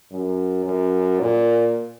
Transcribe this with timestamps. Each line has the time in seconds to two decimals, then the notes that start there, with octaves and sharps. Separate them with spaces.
0.11 F#2
0.65 F#2
1.20 A#2